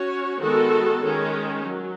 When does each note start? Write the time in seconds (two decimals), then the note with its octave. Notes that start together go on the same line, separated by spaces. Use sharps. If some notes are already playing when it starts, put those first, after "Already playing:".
Already playing: C#4 F#4 C#5
0.40 D#3 G#3 B3 F#4 A4
1.03 D#3 G#3 C#4
1.66 F#3